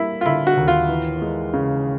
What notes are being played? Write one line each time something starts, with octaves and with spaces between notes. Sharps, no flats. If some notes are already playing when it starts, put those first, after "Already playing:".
Already playing: G3 A#3 E4
F4
D3 E4
F#4
D#2
F4
E3
G#3
C#3